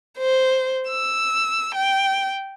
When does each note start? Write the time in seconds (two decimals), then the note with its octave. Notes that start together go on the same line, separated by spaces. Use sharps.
0.18 C5
0.89 E6
1.75 G5